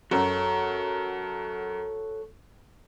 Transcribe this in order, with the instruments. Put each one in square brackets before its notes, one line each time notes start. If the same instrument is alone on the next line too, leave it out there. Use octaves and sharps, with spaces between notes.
[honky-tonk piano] F#2 [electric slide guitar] F#4 A4 C#5